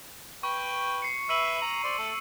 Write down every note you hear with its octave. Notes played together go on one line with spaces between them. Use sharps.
B4 G5 C#6
C7 C#7
B4 E5 E6 D#7 F#7
A#5
C5 D5
A3 A4